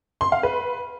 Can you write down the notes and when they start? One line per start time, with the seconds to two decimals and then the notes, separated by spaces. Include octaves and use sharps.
0.21 C6
0.32 F5
0.43 B4